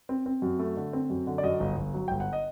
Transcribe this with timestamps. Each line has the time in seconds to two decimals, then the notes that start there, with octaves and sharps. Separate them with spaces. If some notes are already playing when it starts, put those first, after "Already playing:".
0.09 C4
0.26 C4
0.42 F#2
0.59 A3
0.76 D3
0.93 C4
1.10 F#2
1.27 D3
1.38 D5
1.44 F#2 D#5
1.60 G1
1.77 G1
1.94 F#3
2.08 G1 G5
2.20 F#5
2.33 D#5